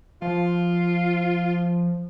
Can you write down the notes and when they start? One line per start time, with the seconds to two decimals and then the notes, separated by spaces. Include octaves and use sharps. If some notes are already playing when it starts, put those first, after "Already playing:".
0.22 F3 F4